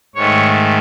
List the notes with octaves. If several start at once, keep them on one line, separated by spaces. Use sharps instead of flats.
G#2 D#3 A3 C#5